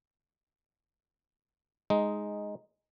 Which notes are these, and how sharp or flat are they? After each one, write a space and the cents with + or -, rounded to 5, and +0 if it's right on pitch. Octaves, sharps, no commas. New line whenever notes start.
G#3 +0 D#4 +0